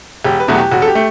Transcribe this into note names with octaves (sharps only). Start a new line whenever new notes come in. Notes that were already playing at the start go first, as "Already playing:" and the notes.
E1 G4
B4
E2 B2 F#3 A3 F#4
G4
E1 F#4
A4
G4
A3